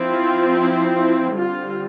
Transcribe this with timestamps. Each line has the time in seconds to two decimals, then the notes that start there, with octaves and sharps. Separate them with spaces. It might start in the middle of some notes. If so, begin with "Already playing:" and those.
Already playing: F3 C4 E4
0.10 F4
0.53 E4
0.95 E4
1.37 D3 G3 C4 F4